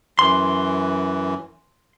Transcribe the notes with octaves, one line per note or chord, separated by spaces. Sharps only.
F#2 E3 C6